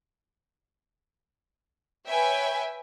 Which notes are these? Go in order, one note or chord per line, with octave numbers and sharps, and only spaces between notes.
B4 C#5 E5 G5 G#5